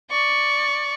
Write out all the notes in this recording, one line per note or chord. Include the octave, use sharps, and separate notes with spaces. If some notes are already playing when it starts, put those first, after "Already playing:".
D5 C#6